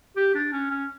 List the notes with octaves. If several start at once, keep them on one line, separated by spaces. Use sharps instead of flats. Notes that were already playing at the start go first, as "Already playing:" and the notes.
G4
D4
C#4
C#4